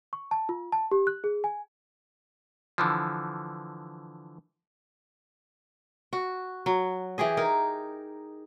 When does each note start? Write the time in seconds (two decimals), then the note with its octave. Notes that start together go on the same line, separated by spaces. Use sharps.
0.13 C#6
0.31 A5
0.49 F4
0.72 A5
0.91 G4
1.07 F#6
1.24 G#4
1.44 G#5
2.78 D3 E3 F3
6.13 F#4
6.66 F#3
7.18 E3 G4 G#4 D#5
7.37 D#4 A#4